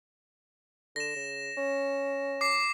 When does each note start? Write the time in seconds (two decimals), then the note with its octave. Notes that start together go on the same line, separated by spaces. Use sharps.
0.96 D3 A#6 E7
1.16 C#3
1.57 C#4
2.41 D6 C7